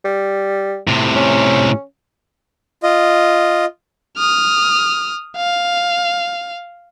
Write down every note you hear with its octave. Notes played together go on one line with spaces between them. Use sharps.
G3
A2 C3
C#4
F4 D#5
D#6 F6
F5